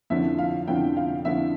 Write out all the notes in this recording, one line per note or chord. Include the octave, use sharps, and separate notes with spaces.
F2 D3 F3 C#4 E4 E5
F5
F2 D3 F3 C#4 E4 G5
F5
F2 D3 F3 C#4 E4 E5